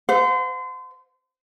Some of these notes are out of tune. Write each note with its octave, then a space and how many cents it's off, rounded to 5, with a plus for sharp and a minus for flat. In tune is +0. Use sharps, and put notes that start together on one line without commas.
C5 -35 F#5 -45